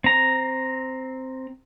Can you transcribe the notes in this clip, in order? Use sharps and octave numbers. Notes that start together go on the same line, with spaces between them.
C4 A#5